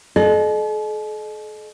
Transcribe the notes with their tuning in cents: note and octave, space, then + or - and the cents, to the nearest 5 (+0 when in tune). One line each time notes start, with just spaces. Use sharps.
A4 -45 D#5 -35